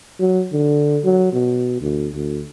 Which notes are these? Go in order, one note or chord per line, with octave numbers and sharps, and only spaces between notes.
F#3
D3
F#3
B2
D2
D2